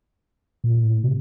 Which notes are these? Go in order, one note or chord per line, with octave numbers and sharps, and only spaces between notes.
A#2
A2
C3